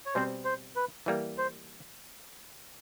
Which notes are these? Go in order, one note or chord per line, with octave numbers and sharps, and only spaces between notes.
C#5
B2 G3 C4 C5
C5
B4
E3 G3 A#3
C5